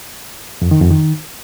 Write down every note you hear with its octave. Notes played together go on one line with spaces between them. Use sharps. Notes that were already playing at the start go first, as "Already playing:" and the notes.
F2
D#3
F2
D#3